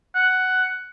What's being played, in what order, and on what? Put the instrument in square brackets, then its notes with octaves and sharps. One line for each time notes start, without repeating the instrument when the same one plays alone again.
[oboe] F#5